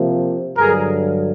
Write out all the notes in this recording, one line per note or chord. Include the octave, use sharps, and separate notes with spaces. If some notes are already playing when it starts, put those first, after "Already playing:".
Already playing: C3 F3 A#3
G2 D3 F#3 G#4 A#4